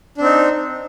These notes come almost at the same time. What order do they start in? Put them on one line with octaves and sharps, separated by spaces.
D4 C4 D#4